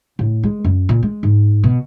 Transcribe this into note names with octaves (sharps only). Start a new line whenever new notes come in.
A2
G#3
F#2
A#2
G#3
G#2
B2